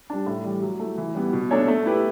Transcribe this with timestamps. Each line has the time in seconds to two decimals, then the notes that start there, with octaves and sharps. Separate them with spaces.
0.10 G3 D4
0.26 A2
0.45 E3 G3
0.62 F#3
0.80 A3 E4
0.97 E3
1.15 G3 B3 E4
1.33 B2
1.51 A3 D4 A4 C#5
1.68 A3
1.86 E4 G4 B4